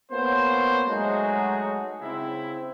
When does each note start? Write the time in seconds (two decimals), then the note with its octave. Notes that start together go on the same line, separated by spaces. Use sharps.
0.12 A#3 B3 C#4 F#4 C5
0.88 F#3 G#3 A3 D#4 F#4 G#4
2.02 C#3 C4 E4